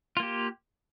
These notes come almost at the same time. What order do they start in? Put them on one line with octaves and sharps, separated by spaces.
F4 A#3 G4